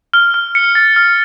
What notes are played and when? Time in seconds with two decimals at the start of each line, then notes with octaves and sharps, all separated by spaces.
0.14 F6
0.34 F6
0.55 C#7
0.75 A6
0.96 F6